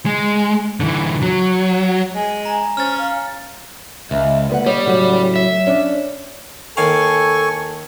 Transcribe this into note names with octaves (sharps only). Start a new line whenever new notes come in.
G#3
D3 E3
F#3
G#3 G#5
A#5
C#4 C5 F6 A6
F5
C#2 E5
D2 A#3 B4 F#5
G3 C#5 D#5
A2 C#3 F#3 F#4
E5
C#4 D4 D5
D#2 D#3 A4 F5 G#5 C#6